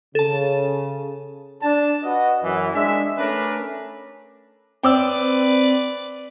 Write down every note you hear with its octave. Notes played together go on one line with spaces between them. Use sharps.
C#3 A4 A5
D4 A5
F#4 B4 D#5
F#2 E3
G#3 D4 E5
A3 C#4 D4 A#4 B4
C4 B4 D5 G5 D6 E6